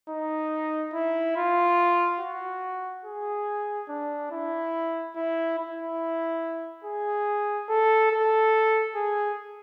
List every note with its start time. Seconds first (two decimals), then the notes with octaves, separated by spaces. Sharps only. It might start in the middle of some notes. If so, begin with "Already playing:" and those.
0.09 D#4
0.93 E4
1.36 F4
2.20 F#4
3.05 G#4
3.89 D4
4.31 E4
5.16 E4
5.58 E4
6.84 G#4
7.69 A4
8.12 A4
8.95 G#4